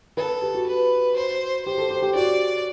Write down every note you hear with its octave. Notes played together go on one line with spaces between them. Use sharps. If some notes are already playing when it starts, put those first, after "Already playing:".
A4 B4
G4
F#4
B4
C5
G4 C5
A4
G4
G4
F#4 D5